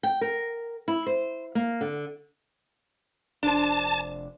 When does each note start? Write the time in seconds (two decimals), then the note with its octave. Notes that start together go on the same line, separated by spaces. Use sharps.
0.03 G5
0.21 A#4
0.88 E4
1.06 C5
1.55 A#3
1.81 D3
3.43 F1 D4 C5 A5